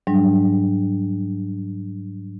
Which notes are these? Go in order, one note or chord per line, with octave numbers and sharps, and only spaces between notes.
G#2 F#3 G3 D4